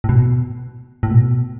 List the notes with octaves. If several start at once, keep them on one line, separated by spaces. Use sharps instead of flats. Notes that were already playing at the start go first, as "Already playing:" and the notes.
A2
B2
A2
B2